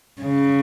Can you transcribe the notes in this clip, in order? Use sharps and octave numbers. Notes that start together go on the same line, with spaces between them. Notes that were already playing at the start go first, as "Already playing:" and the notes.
C#3